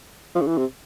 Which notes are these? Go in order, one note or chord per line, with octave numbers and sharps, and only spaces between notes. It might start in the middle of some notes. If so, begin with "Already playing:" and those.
F3
C#3
E3
C3